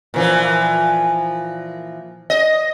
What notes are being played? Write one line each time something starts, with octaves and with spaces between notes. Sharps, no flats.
A#2 E3 F3
D#5